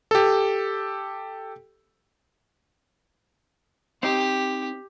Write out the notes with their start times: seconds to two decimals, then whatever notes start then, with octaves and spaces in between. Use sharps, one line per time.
0.11 G4 A4
4.03 C4 D#4 G4